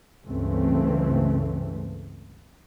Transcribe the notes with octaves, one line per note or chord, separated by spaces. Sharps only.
C#2 G2 C#3 E3 A3 C4